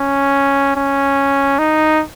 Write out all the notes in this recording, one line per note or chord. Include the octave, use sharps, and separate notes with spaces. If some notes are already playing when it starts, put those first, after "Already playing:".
Already playing: C#4
C#4
D#4